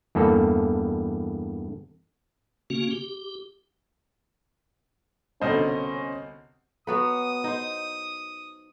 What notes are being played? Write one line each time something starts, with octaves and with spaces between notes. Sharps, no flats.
E2 G2 A#3 A4
C#3 A#3 C#4 F#4
G4
C2 B2 D3 C#4 C5 D#5
F#3 B3 B4 D#6
D#4 C5